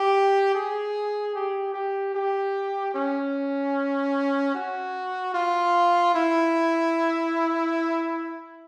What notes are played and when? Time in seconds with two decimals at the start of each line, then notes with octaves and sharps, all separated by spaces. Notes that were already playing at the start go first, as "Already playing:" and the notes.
Already playing: G4
0.54 G#4
1.35 G4
1.74 G4
2.14 G4
2.94 C#4
4.54 F#4
5.34 F4
6.15 E4